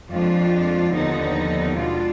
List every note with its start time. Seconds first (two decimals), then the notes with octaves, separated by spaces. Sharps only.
0.11 F2 F3 G#3 D4 F4
0.94 D#2 D3 F3 B3 D#4
1.77 B2 G#3 D4 F4